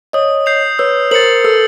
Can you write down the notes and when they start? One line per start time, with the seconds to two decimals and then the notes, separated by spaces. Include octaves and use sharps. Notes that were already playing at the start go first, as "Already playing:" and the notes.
0.13 C#5 D#5 D#6
0.46 G6 C7 F7
0.79 B4 C#5 E6
1.11 A#4 C5 A6 C#7 F#7
1.44 A4 B4 E6